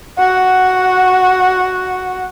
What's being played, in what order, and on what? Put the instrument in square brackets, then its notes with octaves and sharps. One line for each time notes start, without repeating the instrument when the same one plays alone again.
[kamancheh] F#4 F#5